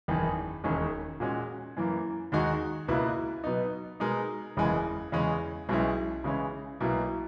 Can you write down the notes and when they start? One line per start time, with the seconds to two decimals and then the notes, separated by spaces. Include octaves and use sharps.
0.08 F#1 E2 D#3
0.64 E1 D#2 D#3 G#3 C#4
1.20 A#2 G#3 C#4 F#4
1.77 F#2 E3 A#3
2.32 D#2 D#3 G#3 D#4 F#4
2.88 C#2 B2 A#3 E4 B4
3.44 B2 F#3 B3 D#4
4.00 B2 G#3 D#4 A#4
4.57 F#1 E2 C#3 E3 G#3
5.12 E2 C#3 G#3 C#4
5.69 B1 B2 G#3 C#4 E4
6.24 C#3 E3 G#3 C#4 E4
6.81 B1 B2 A#3 E4